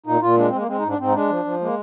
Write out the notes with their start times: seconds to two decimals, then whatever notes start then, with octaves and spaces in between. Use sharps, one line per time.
0.06 A#2 D#4
0.21 A#2 F4
0.37 G#3 D4
0.48 C4
0.53 G#3 A#3
0.68 G#3 C4
0.79 D#4
0.83 G#2 D4
0.98 G#2 C4
1.08 D#4
1.14 G#3 D4
1.30 F3
1.45 F3
1.61 G#3 A#3